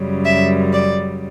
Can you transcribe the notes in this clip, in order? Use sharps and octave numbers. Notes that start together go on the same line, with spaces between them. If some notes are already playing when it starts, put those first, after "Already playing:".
Already playing: F#2 C#3 G3
E5
D5